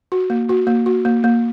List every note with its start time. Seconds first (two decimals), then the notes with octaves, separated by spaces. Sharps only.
0.12 F#4
0.30 A#3
0.49 F#4
0.67 A#3
0.86 F#4
1.05 A#3
1.24 A#3